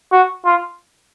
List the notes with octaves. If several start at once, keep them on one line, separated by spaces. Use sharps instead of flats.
F#4
F4